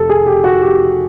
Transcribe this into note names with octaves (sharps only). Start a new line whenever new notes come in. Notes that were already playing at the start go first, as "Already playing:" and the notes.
Already playing: F1 A4
G#4
G4
F#4
G4